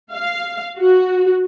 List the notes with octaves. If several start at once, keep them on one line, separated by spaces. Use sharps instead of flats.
F5
F#4